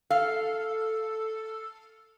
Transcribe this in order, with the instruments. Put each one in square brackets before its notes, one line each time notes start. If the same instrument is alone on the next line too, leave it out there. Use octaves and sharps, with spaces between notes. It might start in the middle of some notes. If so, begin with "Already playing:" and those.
[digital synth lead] A4 [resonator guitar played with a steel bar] F5